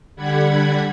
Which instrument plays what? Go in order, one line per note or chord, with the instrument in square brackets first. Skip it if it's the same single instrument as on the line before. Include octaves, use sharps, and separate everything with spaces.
[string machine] D3 G3 F#5 B5 G#6